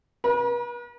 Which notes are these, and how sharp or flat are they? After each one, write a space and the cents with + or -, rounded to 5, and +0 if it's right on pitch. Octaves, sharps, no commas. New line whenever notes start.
B4 -40 A#5 +35